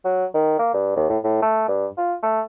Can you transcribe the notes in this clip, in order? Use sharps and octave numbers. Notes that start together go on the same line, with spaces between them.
F#3
D#3
A#3
G2
D#2
A2
A2
A3
G2
F4
A3